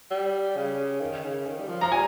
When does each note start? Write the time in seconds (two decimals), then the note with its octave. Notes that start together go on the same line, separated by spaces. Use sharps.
0.11 G3
0.56 C#3
1.00 D#3
1.24 C#3
1.47 D#3
1.59 G3
1.68 F3
1.81 F3 A#5
1.91 G3 G#5